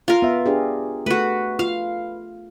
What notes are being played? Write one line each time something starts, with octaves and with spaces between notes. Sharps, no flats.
F4 A#4
B3 E5
D4 G4 G#4
A3 F#4 B4
F4 F5